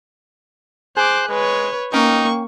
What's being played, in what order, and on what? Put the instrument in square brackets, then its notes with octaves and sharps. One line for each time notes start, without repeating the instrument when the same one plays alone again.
[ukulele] G#4 [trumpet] C5 [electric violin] D6 F#6
[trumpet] G#3 [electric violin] B4 C#5
[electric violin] A#3 C#6 [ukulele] C#4 G5 [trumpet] D#4